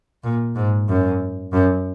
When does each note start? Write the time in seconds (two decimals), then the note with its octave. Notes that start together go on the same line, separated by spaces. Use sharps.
0.24 A#2
0.56 G#2
0.89 F#2
1.53 F#2